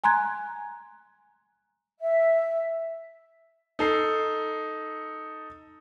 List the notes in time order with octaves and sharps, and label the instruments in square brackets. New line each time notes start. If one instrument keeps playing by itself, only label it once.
[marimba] G#5 A#5 C6 F#6 G#6
[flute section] E5
[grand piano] D#4 A4 C7